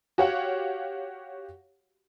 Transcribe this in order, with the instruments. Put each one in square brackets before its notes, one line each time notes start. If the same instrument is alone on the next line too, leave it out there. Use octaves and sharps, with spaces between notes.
[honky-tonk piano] F#4 G4 C#5 F5 F#5